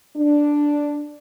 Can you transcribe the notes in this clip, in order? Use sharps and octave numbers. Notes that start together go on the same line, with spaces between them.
D4